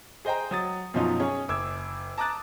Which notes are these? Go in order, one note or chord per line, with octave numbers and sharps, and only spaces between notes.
G#4 C5 D#5 G5 A#5
F#3 D#6 A6
F#2 B2 F3 F#3 D#4 F4
C#4 G#4 C#5
F#1 D6 E6 G#6
A5 A#5 D6 D#6 F#6 A6